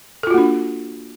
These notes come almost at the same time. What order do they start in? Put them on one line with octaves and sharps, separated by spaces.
A4 F4 F#4 A#3 D4